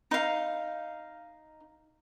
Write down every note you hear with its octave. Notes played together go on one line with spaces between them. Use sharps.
D#4 F5